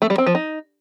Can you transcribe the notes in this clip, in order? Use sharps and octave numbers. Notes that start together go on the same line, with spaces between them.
A3
G3
C4
F3
D#4